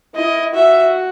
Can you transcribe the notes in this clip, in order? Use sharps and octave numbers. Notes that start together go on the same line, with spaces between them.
E4 D#5
F#4 E5